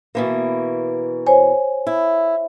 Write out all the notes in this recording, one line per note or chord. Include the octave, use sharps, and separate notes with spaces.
B2 E3 A#3
C5 C#5 G#5
E4